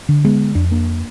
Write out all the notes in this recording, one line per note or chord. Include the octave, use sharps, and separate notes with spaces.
D3
G#3 B3
F2 D4
A#3 D4